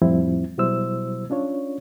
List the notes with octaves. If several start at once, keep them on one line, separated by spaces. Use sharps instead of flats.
F2 A2 F3 G3 C4 E4
B2 F#3 G3 E4 C5 E6
C#4 D4 F4 C#5